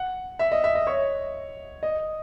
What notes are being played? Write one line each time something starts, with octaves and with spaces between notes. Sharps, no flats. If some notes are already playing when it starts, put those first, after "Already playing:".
Already playing: F#5
E5
D#5
E5
D#5
C#5
D#5